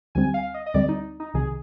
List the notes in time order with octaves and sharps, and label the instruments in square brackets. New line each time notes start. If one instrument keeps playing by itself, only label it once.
[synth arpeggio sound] D2 D3 G3 C4 [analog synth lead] G#5
[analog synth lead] F5
D#5
D#5
[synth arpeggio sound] D2 D3 G3 C4 [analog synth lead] D5
[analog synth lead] D#4
D#4
[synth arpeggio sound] C2 C3 D#3 [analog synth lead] G#4